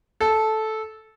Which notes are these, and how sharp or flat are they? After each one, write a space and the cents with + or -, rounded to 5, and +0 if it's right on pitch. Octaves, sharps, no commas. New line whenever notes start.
A4 -10